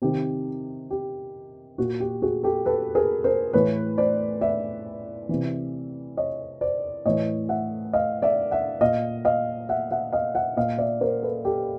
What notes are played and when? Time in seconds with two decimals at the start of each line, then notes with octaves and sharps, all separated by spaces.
0.02 C3 D#3 G4
0.90 G4
1.78 A#2 F#4
2.00 G4
2.22 F#4 G#4
2.43 G4 A4
2.65 A4 B4
2.95 G#4 A#4
3.24 A#4 C5
3.53 A2 E3 B4 C#5
3.98 C5 D5
4.41 D5 E5
5.29 C3 E3
6.17 C#5 D#5
6.61 C5 D5
7.05 A2 E3 C#5 D#5
7.49 E5 F#5
7.93 D#5 F5
8.22 D5 E5
8.51 E5 F#5
8.81 A#2 D#5 F5
9.25 D#5 F5
9.69 E5 F#5
9.91 E5 F#5
10.12 D#5 F5
10.35 E5 F#5
10.57 A#2 D#5 F5
10.78 D5 E5
11.01 A#4 C5
11.23 A4 B4
11.45 G4 A4